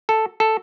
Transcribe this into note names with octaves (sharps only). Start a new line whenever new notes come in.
A4
A4